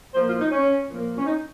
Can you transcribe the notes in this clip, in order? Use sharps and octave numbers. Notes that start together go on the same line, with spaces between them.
A#2 F3 A#3 C5
F4
D#4
C#4
A#2 F3 A#3
C#4
D#4